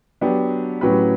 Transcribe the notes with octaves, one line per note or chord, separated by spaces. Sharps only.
F#3 B3 D4 G4
A2 F#3 C#4 G4 B4